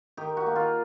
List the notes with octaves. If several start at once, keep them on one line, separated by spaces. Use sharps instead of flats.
D#3 G4
F#4
A#3
F4